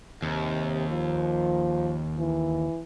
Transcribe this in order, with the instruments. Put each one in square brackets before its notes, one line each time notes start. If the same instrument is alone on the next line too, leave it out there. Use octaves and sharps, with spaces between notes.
[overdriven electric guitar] D#2 [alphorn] C3
[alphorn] F3
E3